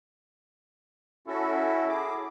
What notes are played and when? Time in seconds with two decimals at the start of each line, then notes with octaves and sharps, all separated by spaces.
1.27 C#4 E4 F#4 A4
1.89 G#4 D6